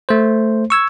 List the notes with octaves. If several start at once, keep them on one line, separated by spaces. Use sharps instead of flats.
A3 C5
C#6 E6 G#6